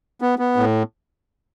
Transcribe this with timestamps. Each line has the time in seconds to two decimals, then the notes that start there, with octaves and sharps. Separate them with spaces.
0.22 B3
0.39 B3
0.56 A2